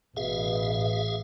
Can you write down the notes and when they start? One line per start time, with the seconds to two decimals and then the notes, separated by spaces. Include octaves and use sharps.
0.17 A1 B2 G#4 E5 F5